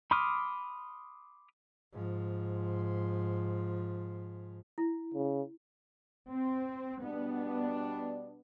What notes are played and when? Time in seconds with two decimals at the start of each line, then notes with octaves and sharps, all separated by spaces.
0.11 B5 C6 D6 D#6 F6
1.93 G#2 F3
4.78 E4
5.14 C#3
6.30 C4
7.03 B2 G3 B3 D4